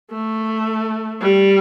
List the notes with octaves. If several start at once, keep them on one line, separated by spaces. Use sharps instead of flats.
A3
G3